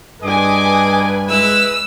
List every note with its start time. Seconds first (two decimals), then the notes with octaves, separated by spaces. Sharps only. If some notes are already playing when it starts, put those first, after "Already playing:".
0.23 G2 G#4 B4 D#5 G#5 D6
1.29 G#3 E4 B4 E6